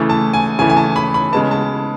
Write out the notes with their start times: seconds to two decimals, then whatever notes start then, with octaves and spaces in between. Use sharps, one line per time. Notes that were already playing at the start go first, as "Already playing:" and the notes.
Already playing: C#3 E3 A3
0.09 A5
0.33 G#5
0.59 C#3 E3 A3 G#5
0.69 G#5
0.77 A5
0.96 B5
1.14 B5
1.33 C#3 G#3 B3 A5
1.51 A5